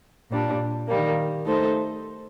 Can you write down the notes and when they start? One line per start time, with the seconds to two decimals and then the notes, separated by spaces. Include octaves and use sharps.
0.31 A#2 G3 D4
0.88 D#3 G3 A#3
1.45 A3 D#4 A4 C5